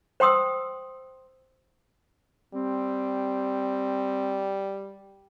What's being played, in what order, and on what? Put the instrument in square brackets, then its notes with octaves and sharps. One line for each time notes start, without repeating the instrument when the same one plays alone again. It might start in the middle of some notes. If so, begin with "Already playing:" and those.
[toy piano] C5 G5 C6 D#6 E6
[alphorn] G3 [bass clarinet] C4